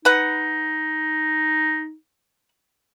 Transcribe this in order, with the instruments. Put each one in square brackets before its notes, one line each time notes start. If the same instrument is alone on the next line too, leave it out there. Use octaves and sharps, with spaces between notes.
[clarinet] D#4 [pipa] B4 F#5